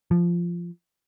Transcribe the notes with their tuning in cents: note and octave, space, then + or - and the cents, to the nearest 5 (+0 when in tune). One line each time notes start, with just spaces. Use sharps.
F3 -10